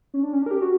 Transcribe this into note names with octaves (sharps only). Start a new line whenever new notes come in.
C#4
D4
C#4
D4
A#4
G4
F#4